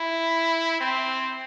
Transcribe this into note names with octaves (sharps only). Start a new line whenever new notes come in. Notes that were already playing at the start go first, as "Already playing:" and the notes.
Already playing: E4
C4